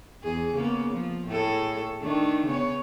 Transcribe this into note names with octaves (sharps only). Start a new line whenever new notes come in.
E2 G#4
C#3 A#3 B3
F3
A2 G#4 A4
D#3 A3 D4
C#3 B3 C#5